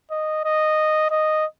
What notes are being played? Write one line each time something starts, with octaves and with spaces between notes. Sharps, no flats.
D#5
D#5
D#5